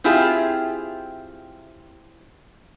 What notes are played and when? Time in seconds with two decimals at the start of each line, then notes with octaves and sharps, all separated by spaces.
0.04 C4 E4 F4 G4 G#4 E5